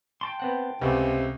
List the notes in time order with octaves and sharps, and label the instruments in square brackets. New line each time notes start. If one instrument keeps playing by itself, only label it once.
[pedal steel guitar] G5 A5 C6
[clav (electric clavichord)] B3 C4 F#5
[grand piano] C#2 [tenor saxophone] C3 [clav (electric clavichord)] A3 B3